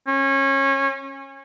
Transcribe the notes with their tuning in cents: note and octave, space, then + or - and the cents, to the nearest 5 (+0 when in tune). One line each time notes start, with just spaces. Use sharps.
C#4 -25